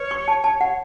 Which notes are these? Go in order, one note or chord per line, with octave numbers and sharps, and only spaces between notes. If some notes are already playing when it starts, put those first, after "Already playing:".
Already playing: B4 C#5
C#6
A5
A5
F#5